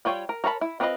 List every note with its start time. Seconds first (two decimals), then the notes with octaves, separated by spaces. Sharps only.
0.05 G3 F4 C#5 G5
0.29 A#4
0.44 A#4 C#5 A5 B5
0.61 E4
0.80 C4 D4 F4 B4 D#5